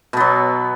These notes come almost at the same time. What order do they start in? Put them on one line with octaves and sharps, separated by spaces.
B2 B3 F#3